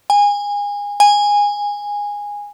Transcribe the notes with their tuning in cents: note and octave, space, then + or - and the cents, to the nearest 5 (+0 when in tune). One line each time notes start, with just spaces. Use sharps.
G#5 -25
G#5 -15